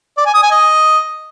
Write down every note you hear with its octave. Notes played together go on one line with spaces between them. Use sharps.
D5
G#5
D#6
G#5
D#5